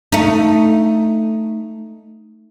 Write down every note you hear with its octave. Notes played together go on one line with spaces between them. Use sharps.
A3 D#4